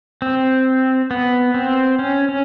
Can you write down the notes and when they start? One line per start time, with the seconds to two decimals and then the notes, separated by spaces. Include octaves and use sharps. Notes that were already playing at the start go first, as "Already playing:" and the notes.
0.22 C4
1.11 B3
1.54 C4
1.99 C#4
2.29 C#4